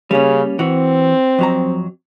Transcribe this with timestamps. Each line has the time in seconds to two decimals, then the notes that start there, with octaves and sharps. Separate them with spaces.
0.11 C#3 G3 A#3 C#4
0.59 E3 C4 F#4
1.39 F2 F#3 A#5